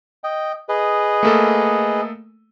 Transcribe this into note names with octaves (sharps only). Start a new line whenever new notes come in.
D#5 G5
G#4 B4 D#5
A3 A#3 A4